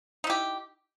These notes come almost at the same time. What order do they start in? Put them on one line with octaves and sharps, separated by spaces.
D#4 E4 G4